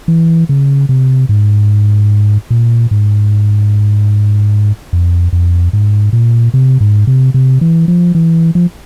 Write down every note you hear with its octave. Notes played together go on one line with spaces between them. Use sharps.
E3
C#3
C3
G#2
A#2
G#2
F2
F2
G#2
A#2
C3
G#2
C3
C3
E3
F3
E3
F3